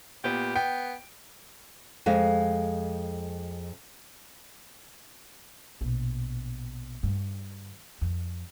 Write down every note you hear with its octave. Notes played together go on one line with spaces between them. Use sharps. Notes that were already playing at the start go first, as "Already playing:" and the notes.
A#2 B3 G4
B3 G5
F2 G#3 F5
A#1 B2
G2 D3
F2